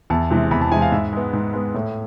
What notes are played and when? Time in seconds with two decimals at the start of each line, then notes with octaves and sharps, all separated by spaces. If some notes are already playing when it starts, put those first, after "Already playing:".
0.10 E2 A5
0.30 C3 E3 G#3
0.51 E2 B5
0.61 A5
0.71 C3 E3 G#3 G#5
0.82 F5
0.92 G#2 E5
1.13 G#3 B3
1.33 G#2
1.53 G#3 B3
1.74 A2